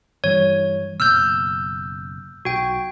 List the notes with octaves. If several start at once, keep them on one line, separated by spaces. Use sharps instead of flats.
G2 E3 G3 C#5
F#1 B2 E6 F6 G6
B1 F#4 G5